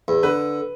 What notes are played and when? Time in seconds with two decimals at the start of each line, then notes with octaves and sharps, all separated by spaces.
0.08 E2
0.23 D3 B4